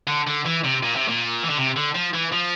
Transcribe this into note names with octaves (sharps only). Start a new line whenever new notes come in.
D3
D3
E3
C3
A#2
C3
A#2
E3
D3
C3
D3
F3
E3
F3